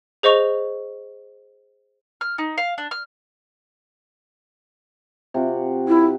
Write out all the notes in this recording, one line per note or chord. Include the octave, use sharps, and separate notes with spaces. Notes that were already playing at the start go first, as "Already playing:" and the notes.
G#4 C5 D#5 C#6 F7
F6
D#4
F5
D4
F6
C3 F4 F#4
E4